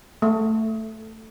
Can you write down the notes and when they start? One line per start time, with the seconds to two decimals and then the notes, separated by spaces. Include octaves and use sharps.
0.22 A3